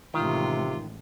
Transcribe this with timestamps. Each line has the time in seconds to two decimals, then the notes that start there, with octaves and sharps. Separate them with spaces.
0.14 A1 C3 D#3 G#3 F4